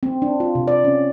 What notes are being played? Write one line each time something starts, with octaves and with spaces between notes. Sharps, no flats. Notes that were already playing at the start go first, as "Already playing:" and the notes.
C4
D4
F4
C3
D5
C#4